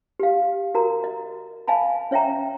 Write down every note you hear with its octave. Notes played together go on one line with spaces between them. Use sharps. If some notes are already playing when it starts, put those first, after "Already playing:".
G4 F5
F#4 A#4 A#5
D#5
D#5 F5 G#5 A5 B5
C#4 C#5 D#5 E5 G5 A#5